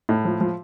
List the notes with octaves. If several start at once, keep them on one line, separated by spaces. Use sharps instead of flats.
A2
F3
F3